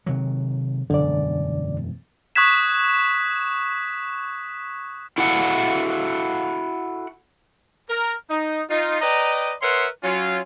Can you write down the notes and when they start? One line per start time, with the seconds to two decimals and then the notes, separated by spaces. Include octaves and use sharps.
0.06 C3 D#3 F#3
0.90 E1 F#2 D3 D5
2.36 C#6 D#6 F#6 G#6 B6 E7
5.18 E4 F#4 A4 F#5
7.90 A#4
8.30 D#4
8.70 D#4 F4
9.02 B4 D5 D#5 G5 A#5
9.62 A#4 B4 C#5 E5 F#5 C6
10.03 F#3 C#4 F4